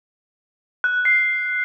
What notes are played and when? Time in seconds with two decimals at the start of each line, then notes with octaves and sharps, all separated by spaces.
0.84 F#6
1.05 C7